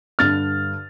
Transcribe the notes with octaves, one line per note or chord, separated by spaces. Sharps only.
G2 D3 F6 A6